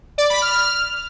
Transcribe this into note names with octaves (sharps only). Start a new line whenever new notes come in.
D5
B5
F6